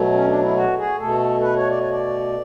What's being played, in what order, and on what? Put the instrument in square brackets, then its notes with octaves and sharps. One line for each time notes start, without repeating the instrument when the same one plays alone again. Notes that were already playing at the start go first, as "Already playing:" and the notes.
Already playing: [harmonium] B2 F#3 A3
C#4
D4
E4
F#4
G#4
B2 A3 A4
B4
C#5
D5
C#5
D5